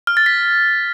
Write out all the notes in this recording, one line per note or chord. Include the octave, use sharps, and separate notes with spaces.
F6
A6
B6